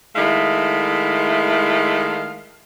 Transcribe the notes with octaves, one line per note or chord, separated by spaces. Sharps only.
D#3 G#3 A3 E4 F5